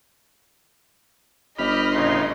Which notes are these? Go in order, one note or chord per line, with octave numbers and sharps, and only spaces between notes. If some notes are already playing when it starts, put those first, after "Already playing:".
G1 G4 D#5 B5 F6
A2 C#3 D#4 C6